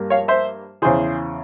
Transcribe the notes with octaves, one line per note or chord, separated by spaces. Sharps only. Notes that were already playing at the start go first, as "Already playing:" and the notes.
Already playing: G2 G3 A#3
C#5 F5
C5 E5
E2 C#3 E3 G#4 C5